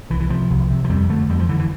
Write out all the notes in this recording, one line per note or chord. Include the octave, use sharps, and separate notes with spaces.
C2 E3
E3
C3 F3
C2
C3
F3
F2 G3
D3 A3
F2 G3
F3
D3 E3
E3